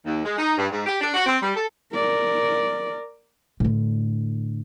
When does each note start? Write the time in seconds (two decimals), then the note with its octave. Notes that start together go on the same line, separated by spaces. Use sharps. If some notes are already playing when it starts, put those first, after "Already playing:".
0.06 D#2
0.25 G#3
0.38 D#4
0.57 G2
0.72 G#2
0.86 G4
1.01 D4
1.14 F#4
1.26 C4
1.42 G3
1.55 A4
1.94 A#4 D5
3.60 A2 D3